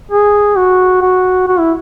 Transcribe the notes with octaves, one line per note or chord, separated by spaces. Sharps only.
G#4
F#4
F#4
F#4
E4